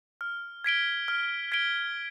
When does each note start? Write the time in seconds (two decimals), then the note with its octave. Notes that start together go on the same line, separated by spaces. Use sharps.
0.21 F6
0.64 G#6 B6 D7 G7
1.08 F6
1.52 G#6 B6 D7 G7